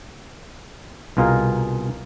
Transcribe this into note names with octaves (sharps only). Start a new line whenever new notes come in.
C2 B2 F4 G#4 A#4 F5